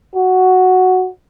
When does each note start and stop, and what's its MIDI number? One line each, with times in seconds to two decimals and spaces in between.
0.15 1.09 66